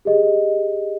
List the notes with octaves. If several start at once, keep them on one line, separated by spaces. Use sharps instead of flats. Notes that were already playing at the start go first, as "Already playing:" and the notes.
G4 G#4 D#5